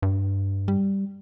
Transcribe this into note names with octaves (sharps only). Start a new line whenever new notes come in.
G2
G3